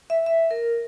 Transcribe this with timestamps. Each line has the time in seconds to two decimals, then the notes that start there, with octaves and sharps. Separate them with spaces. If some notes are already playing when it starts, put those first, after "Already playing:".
0.10 E5
0.26 E5
0.51 A#4